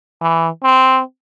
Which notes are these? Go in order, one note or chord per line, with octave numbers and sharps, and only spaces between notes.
E3
C4